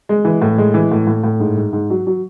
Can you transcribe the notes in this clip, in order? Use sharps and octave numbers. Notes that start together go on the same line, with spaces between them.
G#3
E3
A2
G#3
E3
A2
A2
A2
G#2
G#2
G#2
F#3
F#3